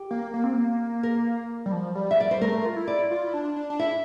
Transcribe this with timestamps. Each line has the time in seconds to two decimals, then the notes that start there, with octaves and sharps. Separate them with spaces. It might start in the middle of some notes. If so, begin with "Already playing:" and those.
Already playing: G4
0.11 A#3
0.34 A#3
0.44 C4
0.53 A#3
1.03 A#4
1.66 G3
1.72 F3
1.95 G3
2.11 E5
2.18 G3 D5
2.31 C5
2.41 A3 A#4
2.65 F4
2.76 E4
2.88 D5
3.11 F4
3.27 E4
3.34 D4
3.56 D4
3.70 D4
3.79 E4 E5